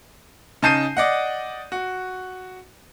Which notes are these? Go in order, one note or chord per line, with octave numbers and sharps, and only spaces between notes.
C#3 D#4 A5 G6 C7 D#7
D5 D#5 F#5
F#4